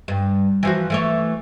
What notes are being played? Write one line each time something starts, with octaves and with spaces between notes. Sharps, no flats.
G2
E3 F3 F#4
E3 A3 C#5